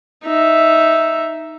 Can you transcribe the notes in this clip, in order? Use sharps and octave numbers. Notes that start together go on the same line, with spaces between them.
D#4 E5